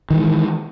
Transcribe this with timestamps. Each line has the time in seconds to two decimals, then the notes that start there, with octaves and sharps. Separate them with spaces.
0.10 D#3
0.13 E3
0.16 G#3